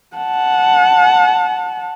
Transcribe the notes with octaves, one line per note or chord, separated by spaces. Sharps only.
F#5 A5